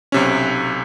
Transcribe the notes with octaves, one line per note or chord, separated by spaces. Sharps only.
B1 C3 C#4